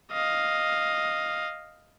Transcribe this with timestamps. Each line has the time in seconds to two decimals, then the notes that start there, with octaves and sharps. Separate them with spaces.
0.12 D#5 F5